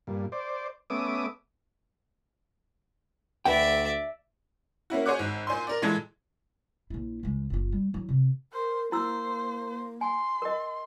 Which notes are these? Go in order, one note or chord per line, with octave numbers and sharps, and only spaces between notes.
G2 A#2
C5 D5
A3 B3 C#4 E5 D6 D#6
D2 B4 D5 E5 F#5 G5
A#3 C#4 E4 F#4
G#4 C5 C#5 F#5 D6 F#6
G#1
A#2 C5 G#5 C6
A#4 D5
A#2 E3 G#3 A4 G#6
A#1 E4
C#2 G#3
F#1 F4
G3
F#3 E4
C3
A#4 C5
A#3 E4 C5 E6
G#5 C6
A#4 D#5